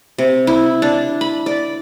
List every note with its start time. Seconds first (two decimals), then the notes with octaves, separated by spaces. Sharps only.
0.18 C3
0.47 E4
0.82 D4
1.21 B5
1.46 D5